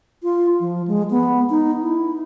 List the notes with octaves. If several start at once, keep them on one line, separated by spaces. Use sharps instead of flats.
F4
F3
G#3
B3
D#4
E4